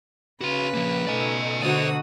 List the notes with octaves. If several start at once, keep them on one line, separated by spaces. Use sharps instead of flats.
C#3 F#4 B4 C6
F3 A#3
B2 A3 D#4 D5 G#5
D3 F#4 C5 D5 D#6